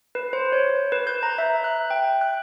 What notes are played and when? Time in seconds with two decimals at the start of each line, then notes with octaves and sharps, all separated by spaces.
0.15 B4
0.33 C5
0.52 C#5
0.92 B4
1.07 G6
1.23 A#5
1.38 E5
1.64 F#6
1.90 G5
2.21 F#6